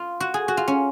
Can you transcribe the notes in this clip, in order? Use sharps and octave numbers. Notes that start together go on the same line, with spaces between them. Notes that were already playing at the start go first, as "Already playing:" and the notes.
Already playing: F4
F#4
G#4
F#4
F4
C#4